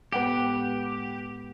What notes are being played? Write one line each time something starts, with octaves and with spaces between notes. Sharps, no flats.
A2 G#3 B3 G4 B4 F#5 G5